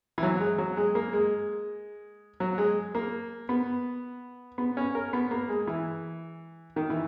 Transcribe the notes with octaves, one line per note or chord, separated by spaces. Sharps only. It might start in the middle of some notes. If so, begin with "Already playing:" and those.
E3
F#3
G#3
F#3
G#3
A#3
G#3
F#3
G#3
A#3
B3
B3
C#4
A#4
B3
A#3
G#3
E3
D#3
E3